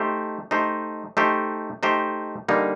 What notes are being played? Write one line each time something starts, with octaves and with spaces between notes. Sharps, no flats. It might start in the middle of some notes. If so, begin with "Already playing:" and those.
Already playing: A3 D#4 G4 C5
A3 D#4 G4 C5
A3 D#4 G4 C5
A3 D#4 G4 C5
D3 G3 A#3 D#4